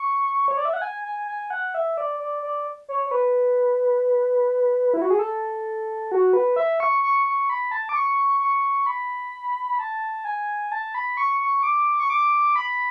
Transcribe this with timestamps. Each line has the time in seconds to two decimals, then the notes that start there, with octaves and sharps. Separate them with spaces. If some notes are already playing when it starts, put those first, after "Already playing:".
Already playing: C#6
0.48 C#5
0.57 D5
0.65 E5
0.73 F#5
0.82 G#5
1.04 G#5
1.28 G#5
1.50 F#5
1.74 E5
1.97 D5
2.20 D5
2.43 D5
2.89 C#5
3.07 C#5
3.11 B4
4.94 E4
5.02 F#4
5.10 G#4
5.19 A4
6.12 F#4
6.33 B4
6.56 E5
6.80 C#6
7.03 C#6
7.27 C#6
7.50 B5
7.71 A5
7.89 D6
7.95 C#6
8.40 C#6
8.86 B5
9.78 A5
10.25 G#5
10.72 A5
10.94 B5
11.17 C#6
11.41 C#6
11.63 D6
12.00 C#6
12.10 D6
12.56 B5